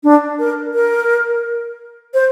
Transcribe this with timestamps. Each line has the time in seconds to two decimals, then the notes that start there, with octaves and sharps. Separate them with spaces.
0.04 D4
0.39 A#4
0.74 A#4
2.14 C5